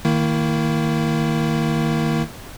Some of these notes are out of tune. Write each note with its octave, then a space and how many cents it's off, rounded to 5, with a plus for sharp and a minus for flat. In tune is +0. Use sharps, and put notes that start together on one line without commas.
D#3 +0 A#3 -25 E4 +0